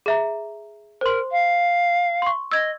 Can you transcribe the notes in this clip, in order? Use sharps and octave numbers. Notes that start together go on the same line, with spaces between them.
G#4 E5 A#5
A#4 C5 C6
F5
C6 C#6
D#5 E6 G#6